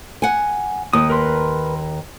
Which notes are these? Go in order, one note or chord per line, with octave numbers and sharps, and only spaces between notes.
F#5 G#5
D#2 D#6
A#4 B4 C6